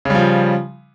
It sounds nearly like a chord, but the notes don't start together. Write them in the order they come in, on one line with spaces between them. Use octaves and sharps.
C#3 G3 F3